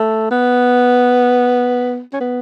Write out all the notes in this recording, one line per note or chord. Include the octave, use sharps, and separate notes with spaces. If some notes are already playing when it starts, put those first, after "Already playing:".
Already playing: A3
B3
C#4
B3